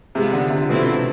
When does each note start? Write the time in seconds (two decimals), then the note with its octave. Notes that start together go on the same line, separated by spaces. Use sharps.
0.15 C3 G#3 B3 F4
0.33 D3
0.50 C3
0.69 B2 F3 A3 C4 E4
0.86 C3